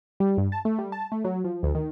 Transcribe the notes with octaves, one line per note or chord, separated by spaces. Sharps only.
G3
G2
A5
A3
G3
A5
A3
F#3
F3
D2
D#3